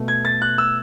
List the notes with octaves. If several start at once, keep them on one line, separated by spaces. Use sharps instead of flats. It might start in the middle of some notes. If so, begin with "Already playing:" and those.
Already playing: B2 A3
G#6
A6
F#6
E6